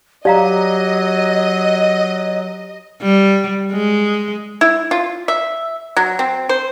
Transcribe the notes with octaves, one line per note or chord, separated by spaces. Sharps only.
F#3 G4 D5 D#5 F5 A#5
G3
G#3
E4
F4
E5
F#3
C4
C5